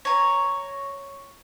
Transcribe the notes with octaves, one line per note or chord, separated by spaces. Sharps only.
C#5 A#5